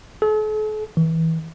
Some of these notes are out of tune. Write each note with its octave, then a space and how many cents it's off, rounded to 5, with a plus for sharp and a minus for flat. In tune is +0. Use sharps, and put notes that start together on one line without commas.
A4 -45
E3 -25